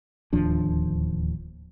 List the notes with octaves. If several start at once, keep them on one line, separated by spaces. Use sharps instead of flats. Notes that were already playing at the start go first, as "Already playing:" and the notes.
D1 D#2 F3 D4